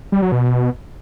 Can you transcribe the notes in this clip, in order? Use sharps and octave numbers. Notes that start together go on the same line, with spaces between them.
G3
F#3
B2